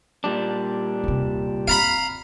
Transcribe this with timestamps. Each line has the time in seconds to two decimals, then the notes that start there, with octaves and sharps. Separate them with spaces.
0.24 A#2 G3 D4
1.04 D#2 C3
1.68 C4 F5 A#5 B5